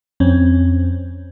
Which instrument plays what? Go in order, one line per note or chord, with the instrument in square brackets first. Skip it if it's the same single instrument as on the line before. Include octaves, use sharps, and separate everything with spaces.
[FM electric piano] F2 C4 C#4